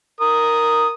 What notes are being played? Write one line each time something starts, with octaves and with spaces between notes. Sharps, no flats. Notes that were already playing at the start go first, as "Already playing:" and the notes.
A#4 D#6